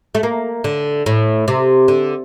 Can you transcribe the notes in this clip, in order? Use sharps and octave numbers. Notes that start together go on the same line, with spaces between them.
A3
A#3
D3
A2
C3
D3